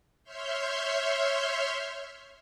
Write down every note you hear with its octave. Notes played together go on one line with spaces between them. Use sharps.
C#5 E5 C6 F6 G6